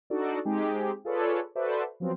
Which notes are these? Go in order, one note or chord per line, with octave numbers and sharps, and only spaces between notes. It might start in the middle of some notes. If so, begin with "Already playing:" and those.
D4 D#4 F#4 A4 D5
G#3 C4 D#4 G4 G#4
F4 G#4 A4 B4 C#5 D5
F#4 A4 B4 C5 D5 E5
F3 F#3 B3 C4 F4